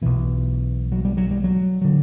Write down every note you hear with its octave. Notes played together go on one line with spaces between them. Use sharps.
B1 B2 E3
F#3
G3
F#3
G3
F#3
D3 F#3